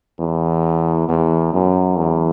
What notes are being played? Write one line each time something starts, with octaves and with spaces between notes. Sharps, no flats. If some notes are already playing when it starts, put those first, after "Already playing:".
E2
E2
F#2
E2